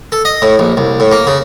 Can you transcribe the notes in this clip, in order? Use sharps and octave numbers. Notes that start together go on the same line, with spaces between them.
A4
D#5
A2
A#1
C2
A2
A#3
C#3